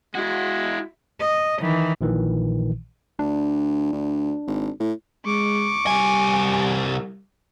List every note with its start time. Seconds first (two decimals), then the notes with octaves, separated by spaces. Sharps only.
0.15 G#3 E4 F#4
1.21 D#5
1.60 D#3 E3
2.01 A#1 A#2 D#3 E3
3.19 D2 D4
3.93 D2
4.47 G#1
4.80 A2
5.26 G#3 C#6 D6
5.87 C2 G3 G#5